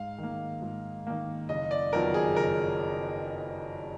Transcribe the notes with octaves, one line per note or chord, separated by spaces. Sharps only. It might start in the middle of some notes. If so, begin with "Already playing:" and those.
Already playing: G#2 F5
D#3 A#3
G#2
D#3 A#3
F#1 D#5
D5
F2 D#3 F#3 B3 A#4
G#4
F#1 A#4